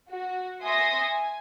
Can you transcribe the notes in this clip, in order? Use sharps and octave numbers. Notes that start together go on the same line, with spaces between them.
F#4
E5 G#5 C6 C#6 D#6 A#6
G#5